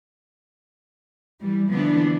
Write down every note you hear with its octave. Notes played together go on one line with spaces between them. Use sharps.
E3 G3
D3 E3 F3 B3 D4